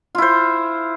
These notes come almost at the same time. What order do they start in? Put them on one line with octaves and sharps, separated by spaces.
F4 E4 C5